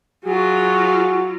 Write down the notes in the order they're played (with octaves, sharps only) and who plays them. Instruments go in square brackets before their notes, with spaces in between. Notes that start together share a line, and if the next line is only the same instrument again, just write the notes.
[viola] F#3 F4 [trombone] F#4 [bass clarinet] G#4